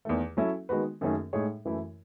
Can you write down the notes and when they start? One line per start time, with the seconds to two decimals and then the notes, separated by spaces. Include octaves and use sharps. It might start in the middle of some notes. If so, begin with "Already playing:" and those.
0.05 E2 D#3 A3
0.37 F#3 C#4 E4 A4 E5
0.69 D#3 G#3 B3 F#4 B4
1.01 F#2 D#3 A3 C#4 G#4
1.33 A2 G#3 D#4 G#4 C#5
1.65 F#2 E3 A3 E4